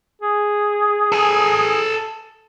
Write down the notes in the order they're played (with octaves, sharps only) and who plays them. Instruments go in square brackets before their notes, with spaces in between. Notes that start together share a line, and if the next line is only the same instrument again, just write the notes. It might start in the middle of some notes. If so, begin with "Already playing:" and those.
[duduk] G#4
[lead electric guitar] A4 G#5